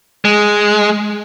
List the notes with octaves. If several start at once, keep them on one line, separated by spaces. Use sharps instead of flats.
G#3